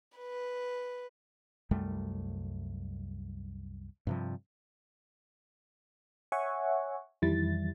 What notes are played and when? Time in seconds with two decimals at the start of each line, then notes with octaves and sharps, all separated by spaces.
0.18 B4
1.71 C2 F#2 G3 A3
4.07 G2 C3 F3
6.32 C#5 E5 F#5 G#5 C#6
7.22 F2 D#3 E3 G3 E4 A6